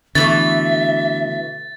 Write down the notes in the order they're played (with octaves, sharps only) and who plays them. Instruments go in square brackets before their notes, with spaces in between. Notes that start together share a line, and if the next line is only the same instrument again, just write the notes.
[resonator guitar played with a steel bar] B2 E3 A3 [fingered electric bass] D3 [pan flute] E5 [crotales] A6